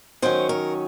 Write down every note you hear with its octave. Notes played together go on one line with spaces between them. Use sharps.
D#3 F#3 C#4 C5
A#4